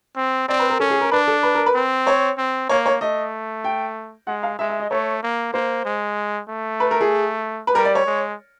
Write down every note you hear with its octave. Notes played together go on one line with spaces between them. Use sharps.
C4
C4 D5
B4
A#4
C#4 A4
G#4
A#4
D4 B4
A4
B4
A#4
B4
C4
C#5
C4
A#3 C#5
C#5
A3 D#5
G5
G#3 F#5
F5
G#3 E5
E5
D#5
A3 C#5
A#3
A#3 C5
G#3
A3
B4
A#4
G#4
B4
G3 A#4
D5
C#5
G#3